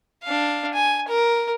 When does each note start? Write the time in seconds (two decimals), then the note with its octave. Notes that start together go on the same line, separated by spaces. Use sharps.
0.24 D4 F5
0.74 G#5
1.08 A#4